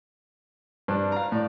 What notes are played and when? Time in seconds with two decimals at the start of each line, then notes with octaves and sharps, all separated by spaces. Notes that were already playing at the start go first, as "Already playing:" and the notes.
0.88 G2 D4
1.12 F5 A#5
1.32 A2 D5